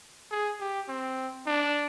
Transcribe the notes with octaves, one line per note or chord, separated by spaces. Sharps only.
G#4
G4
C4
D4